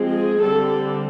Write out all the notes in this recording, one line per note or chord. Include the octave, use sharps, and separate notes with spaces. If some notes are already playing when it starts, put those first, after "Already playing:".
Already playing: F3 G#3 C4
G#4
D3 G3 C4 A4